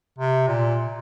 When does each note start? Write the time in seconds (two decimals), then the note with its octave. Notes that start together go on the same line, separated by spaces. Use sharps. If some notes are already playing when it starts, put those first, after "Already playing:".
0.18 C3
0.48 A#2